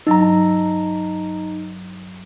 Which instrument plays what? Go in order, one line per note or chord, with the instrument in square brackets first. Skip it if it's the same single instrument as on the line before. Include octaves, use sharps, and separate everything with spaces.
[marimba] G2 F#3 E6 [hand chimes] D#4 A#5